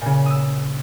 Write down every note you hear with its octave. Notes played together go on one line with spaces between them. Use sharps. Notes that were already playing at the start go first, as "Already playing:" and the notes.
A#2 C#3
D#6 E6